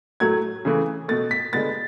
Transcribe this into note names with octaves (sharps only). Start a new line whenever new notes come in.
A2 F#3 A3 G#6
C#3 E3 A3
B2 A3 A6
B6
D3 G#3 B3 A6